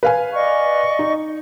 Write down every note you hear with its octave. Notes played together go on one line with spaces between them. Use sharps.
B4 F5 G#5
D5 D#5 C#6
D#4